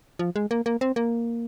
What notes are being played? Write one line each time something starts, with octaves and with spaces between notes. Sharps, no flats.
F3
G#3
A#3
A#3
C4
A#3